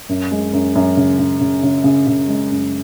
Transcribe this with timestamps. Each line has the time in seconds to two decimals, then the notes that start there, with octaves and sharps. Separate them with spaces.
0.09 F#2
0.31 G#3
0.53 F#2
0.75 F#2
0.97 C#3
1.19 C#3
1.41 C#3
1.63 C#3
1.84 C#3
2.07 C#3
2.28 G#3
2.51 F#2